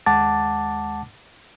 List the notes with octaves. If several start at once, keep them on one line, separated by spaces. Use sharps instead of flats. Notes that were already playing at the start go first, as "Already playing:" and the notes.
D#2 G#3 F#5 A5 D6 A6